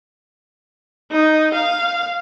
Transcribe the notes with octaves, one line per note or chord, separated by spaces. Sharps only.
D#4
F5